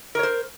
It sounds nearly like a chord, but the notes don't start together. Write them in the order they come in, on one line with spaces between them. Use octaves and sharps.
A#4 C#5 C5